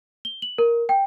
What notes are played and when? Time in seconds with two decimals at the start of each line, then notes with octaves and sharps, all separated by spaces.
0.25 G7
0.42 F#7
0.58 A#4
0.89 G5